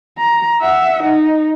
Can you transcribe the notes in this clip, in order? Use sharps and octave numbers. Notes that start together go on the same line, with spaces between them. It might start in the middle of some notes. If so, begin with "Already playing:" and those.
A#5
E5 F#5
D#4